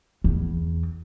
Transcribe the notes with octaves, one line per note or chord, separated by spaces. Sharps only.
E2